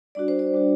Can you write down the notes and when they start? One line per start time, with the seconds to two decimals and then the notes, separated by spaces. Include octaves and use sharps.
0.15 G3 D4 F#4 D5
0.28 C5
0.39 D5
0.53 G3 D4 F#4